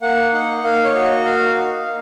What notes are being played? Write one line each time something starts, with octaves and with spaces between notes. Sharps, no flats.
A#3 F#5
D#4 F#5
A#3 F5
C#5
F#4
D#5
A#3 F5
D#4
A#3